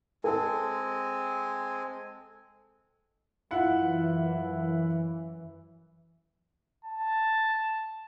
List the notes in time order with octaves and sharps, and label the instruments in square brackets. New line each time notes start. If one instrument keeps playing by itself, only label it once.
[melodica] G#3 C4 G#5 [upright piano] A4
[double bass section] F#2 E3 [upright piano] E4 F4 F#5
[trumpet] A5